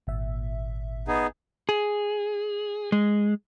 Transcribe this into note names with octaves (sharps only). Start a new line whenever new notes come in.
G#1 A#2 E5
B3 D#4 G#4
G#4
G#3